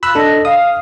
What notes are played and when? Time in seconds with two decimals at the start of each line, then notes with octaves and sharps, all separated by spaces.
0.03 F4 B5 E6 F#6
0.15 D4 D#4 A4 D#5
0.45 F5 D#6